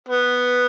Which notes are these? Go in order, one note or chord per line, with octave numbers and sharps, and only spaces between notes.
B3